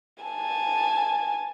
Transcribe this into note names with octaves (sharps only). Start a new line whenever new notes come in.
G#5 A5